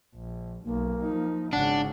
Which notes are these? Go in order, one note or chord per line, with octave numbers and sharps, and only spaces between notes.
A#1
B1 A#3
F3 D#4
G#1 C#3 D4 F#5